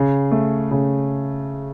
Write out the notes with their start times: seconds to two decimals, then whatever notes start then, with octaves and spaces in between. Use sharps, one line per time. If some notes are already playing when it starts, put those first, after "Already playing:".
Already playing: C#3
0.32 A3
0.71 C#3